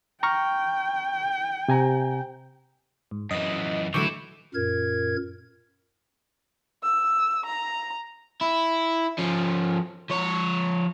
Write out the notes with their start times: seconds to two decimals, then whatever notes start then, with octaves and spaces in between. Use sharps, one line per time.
0.23 G5 A#5 C#6 F6
1.68 C3 G#5 A#5
3.11 G#2
3.31 F#2 E3 D#5
3.94 D3 E3 F#3 A3 E4 C#6 D6 G6
4.54 F#2 A#2 A#4 G#6
6.84 E6
7.46 A#5
8.41 E4
9.18 F3 C#4
10.10 F3 C#5